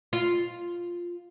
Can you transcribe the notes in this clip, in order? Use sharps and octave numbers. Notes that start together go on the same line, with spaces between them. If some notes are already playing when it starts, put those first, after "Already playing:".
F4